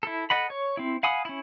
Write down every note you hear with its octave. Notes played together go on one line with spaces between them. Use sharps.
E4 A4
A4 D#5 F#5 B5
C#5
C4 E4
F5 F#5 G#5 B5 D#6
C#4 E4